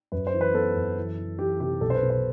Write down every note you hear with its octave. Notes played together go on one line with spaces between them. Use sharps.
F#2 B4
C5
E3
B4
B3 A4
F#2
E3
E3
E3 G4
C3 G4
B1 A4
C5
B4
B2
C5